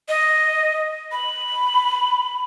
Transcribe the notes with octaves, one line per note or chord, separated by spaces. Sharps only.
D#5
B5